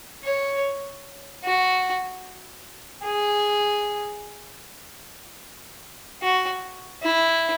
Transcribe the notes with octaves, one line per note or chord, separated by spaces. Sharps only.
C#5
F#4
G#4
F#4
E4